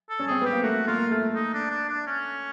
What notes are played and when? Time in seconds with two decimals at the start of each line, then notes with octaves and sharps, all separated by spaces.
0.10 A4
0.19 C#4
0.28 C4 G#4
0.41 B3 G4
0.53 A#3
0.63 A3 F#4
0.88 A#3 F4
1.11 A3
1.35 D#4
1.54 D4
1.71 D4
1.89 D4
2.07 C#4